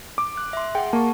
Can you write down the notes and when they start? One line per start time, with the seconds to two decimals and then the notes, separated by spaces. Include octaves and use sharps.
0.18 D6
0.37 F#6
0.53 E5 C6
0.75 G#4 F#5 G5
0.93 A#3 A5 C#6